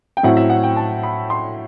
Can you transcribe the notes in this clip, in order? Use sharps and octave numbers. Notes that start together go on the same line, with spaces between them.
G5
A2 F#3 C4 E4 F#5
E5
F#5
G5
A5
B5
C6